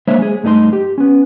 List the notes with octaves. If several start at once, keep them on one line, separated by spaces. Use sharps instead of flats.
G#3 A#3 D4 C5 C#5 E5
G#3 G#4
G2 A3 D#4 A#4 C6
G4
B3 C#4